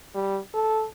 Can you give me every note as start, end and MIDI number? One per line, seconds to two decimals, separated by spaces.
0.15 0.39 55
0.54 0.85 69